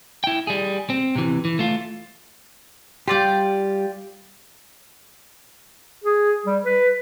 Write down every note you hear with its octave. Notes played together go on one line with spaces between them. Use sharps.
E4 G5
G3 G#4
C4
C3 E3
E3
A3 F4
G3 F4 G4 D5 G5
G#4
G3
B4